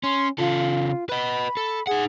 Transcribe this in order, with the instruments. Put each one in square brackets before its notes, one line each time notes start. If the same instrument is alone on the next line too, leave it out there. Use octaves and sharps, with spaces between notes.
[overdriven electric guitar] C#4 [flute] C6
[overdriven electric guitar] C#3 A4 [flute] F4
[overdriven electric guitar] B4 D#5 [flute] B5
[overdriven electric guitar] A4
[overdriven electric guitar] D#4 F#5 [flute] G#4